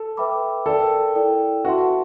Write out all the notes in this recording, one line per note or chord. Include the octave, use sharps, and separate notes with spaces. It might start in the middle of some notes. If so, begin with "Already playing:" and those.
Already playing: A4
B4 E5 G5 B5 D6
A4 A#4 D5 G5
E4 A4 D5 G5
F#4 B4 E5 A5 C6